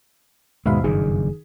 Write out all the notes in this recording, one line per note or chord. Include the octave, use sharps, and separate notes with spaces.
D#2 G#2 B2 G#3 E5 F5 B5
F#1 G2 A#2 D#3 G#4